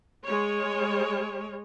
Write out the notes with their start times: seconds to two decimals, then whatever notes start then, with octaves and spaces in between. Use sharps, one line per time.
0.25 G#3 C#5